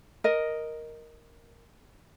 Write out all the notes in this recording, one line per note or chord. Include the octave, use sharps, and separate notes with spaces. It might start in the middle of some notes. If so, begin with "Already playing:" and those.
A#4 D#5